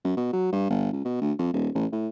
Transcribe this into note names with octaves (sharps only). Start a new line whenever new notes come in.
F#2
B2
F#3
G2
G1
C#2
B2
D2
F2
D#1
A1
A2